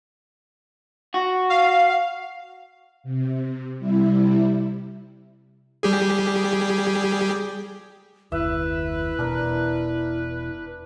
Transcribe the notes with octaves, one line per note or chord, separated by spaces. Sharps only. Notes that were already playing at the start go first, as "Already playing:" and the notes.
F#4
F5
C3
C3 G3 E4
G3 G4 G#4
F#1 D#2 E4 B4 E5
E1 B2 D4 A#4